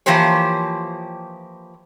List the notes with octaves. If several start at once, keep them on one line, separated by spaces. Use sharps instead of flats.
E3 F3 A#3 G4 C5 C#5